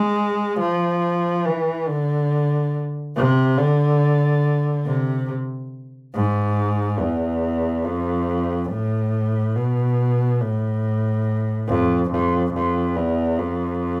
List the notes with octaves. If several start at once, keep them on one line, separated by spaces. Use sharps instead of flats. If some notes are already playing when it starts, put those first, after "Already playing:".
Already playing: G#3
F3
E3
D3
C3
D3
C3
G#2
E2
F2
A2
B2
A2
F2
F2
F2
E2
F2